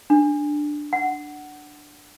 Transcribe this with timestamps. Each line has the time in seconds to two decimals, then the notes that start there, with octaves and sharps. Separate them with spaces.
0.10 D4
0.93 F#5